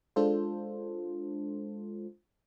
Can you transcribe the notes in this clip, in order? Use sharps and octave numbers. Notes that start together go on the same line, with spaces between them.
G#3 D4 F4 A4 C5